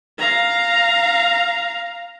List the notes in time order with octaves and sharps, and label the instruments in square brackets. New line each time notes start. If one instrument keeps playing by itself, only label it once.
[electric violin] F5 A#5